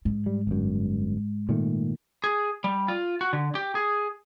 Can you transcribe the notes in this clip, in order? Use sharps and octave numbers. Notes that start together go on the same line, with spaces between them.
G#2
G3
G1 F#2
A#2 D#3 A3
G#4
G3
F4
F#4
D3
G4
G#4